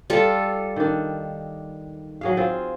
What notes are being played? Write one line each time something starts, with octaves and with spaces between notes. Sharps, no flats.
G3 F4 A4
D#3 D4
F#3 G#4 F5
C4 F4